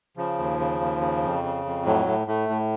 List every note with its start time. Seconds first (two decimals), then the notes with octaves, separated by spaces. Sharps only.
0.17 C#3 F3
0.38 D#2
0.59 C#3
0.81 D#2
1.01 C#3
1.23 F2
1.43 C#3
1.65 F2
1.85 A2 F#3
2.06 A2
2.27 A2 A3
2.49 A2